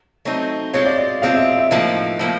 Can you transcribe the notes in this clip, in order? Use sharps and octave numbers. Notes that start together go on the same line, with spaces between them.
F#3 A3 C4 D#4
G#3 C4 F4 C#5
D5
D5
G#3 C4 F4 F5
E5
E5
A2 F3 A#3 D#4
A2 F3 A#3